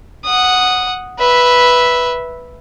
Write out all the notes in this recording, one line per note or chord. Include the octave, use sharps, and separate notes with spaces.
F#5 D#6
B4 E5